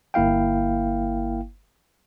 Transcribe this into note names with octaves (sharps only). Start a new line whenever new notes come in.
G1 A#3 E4 F5 G5